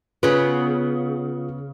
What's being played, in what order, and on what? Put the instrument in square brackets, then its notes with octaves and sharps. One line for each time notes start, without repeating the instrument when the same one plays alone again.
[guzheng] C#3 G#4 [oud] B3 [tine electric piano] F4